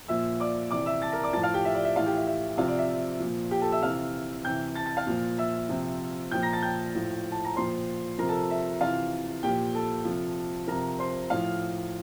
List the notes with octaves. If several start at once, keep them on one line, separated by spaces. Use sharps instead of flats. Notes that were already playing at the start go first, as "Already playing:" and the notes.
A#2 F3 E5 E6
D5 D6
C3 E3 D5 D6
E5 E6
A5 A6
A#4 A#5
D5 D6
A2 F3 A5 A6
F5 F6
G4 G5
E5
D5
E5
A2 E3 F4 F5
G4 G5
E5
E5
C3 F3 F4 F5
D5
E5
A#2 F3
G4 G5
A4 A5
E5 E6
C3 E3 F5 F6
C3 E3 G5 G6
A5 A6
A5 A6
F5 F6
A#2 F3
E5 E6
C3 F3
A#2 F3 G5 G6
A#5 A#6
A5 A6
G5 G6
A2 F3
A5
A#5
A#2 F3 C5 C6
C3 F3 A#4 A#5
A4 A5
E5
C3 E3 F4 F5
A#2 F3 G4 G5
A4 A5
C3 F3
C3 F3 A#4 A#5
C5 C6
A2 F3 F5 F6